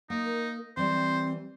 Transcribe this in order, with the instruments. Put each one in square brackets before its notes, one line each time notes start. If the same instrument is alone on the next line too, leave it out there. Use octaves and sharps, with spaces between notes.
[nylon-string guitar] A#3 [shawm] D#4
[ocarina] A#4
[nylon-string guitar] E3 G3 [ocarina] C4 [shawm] C5